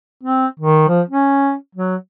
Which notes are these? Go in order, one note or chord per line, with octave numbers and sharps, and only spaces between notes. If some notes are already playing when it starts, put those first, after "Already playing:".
C4
D#3
F3
C#4
F#3